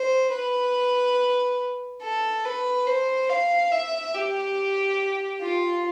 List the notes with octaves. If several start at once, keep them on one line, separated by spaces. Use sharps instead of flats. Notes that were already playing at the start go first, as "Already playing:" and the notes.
Already playing: C5
B4
A4
B4
C5
F5
E5
G4
F4